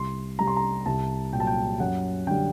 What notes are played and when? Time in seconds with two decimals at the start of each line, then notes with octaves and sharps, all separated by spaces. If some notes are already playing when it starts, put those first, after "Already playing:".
Already playing: C2 C6
0.39 C3 G3 A#5
0.47 C6
0.56 A#5
0.86 C2 A5
1.33 A#2 G5
1.37 F#3 A5
1.47 G5
1.80 F#2 F#5
2.27 D3 G3 G5